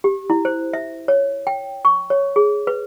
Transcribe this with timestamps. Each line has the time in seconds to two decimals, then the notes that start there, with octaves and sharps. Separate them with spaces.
0.04 G4
0.30 E4
0.45 C5
0.74 E5
1.08 C#5
1.47 G5
1.85 C#6
2.10 C#5
2.36 G#4
2.67 B4